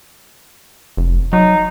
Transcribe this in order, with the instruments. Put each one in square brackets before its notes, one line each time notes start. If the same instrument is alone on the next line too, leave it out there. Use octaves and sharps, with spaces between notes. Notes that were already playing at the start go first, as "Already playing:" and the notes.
[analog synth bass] F1
[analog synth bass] F#3 [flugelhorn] D#4